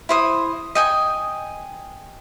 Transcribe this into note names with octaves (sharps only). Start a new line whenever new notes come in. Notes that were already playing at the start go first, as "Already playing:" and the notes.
E4 C5 D#6
D#5 G5 G#5